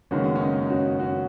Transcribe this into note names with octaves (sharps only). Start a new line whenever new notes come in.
F#1 F#2 D#3 G#3 B3 C#4 F#4
C#4
D#4
C#4 F#4
C#4 F#4